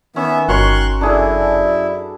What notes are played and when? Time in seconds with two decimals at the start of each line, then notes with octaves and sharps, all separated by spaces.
0.16 D#3 B3 C#4 E5
0.49 G1 F#4 A#4 C#5 C6 C#6 F#6
1.01 F#2 D4 E4 G#4 A4 D5